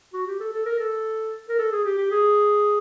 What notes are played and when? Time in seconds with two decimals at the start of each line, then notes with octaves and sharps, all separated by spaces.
0.14 F#4
0.27 G4
0.40 A4
0.53 A4
0.66 A#4
0.79 A4
1.49 A#4
1.59 A4
1.71 G#4
1.85 G4
1.98 G4
2.11 G#4